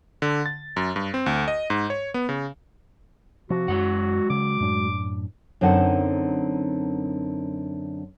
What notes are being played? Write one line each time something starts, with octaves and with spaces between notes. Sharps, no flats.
D3
A6
F#2
G2
C4
D2
D#5
G#2
C#5
B3
C#3
C3 F3 F#4
F#2 F#3 G#3 F#5
C#3 D6
F#2 A2 D4
F#2 D3 C4 D#4 F#5 A5